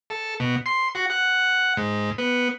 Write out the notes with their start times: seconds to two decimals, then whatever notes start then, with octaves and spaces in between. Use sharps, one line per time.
0.10 A4
0.40 B2
0.66 C6
0.95 F#4
1.10 F#5
1.77 G#2
2.18 B3